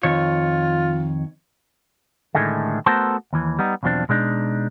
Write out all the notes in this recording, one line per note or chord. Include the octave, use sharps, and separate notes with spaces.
F2 D#3 F4 C#5
A2 D3 D#3 G#3 A3
A3 B3 F#4 A4 A#4 C5
D#2 E3
G3 B3 D#4
B1 E2 B2 F3 C4 D4
B2 G#3 D4 D#4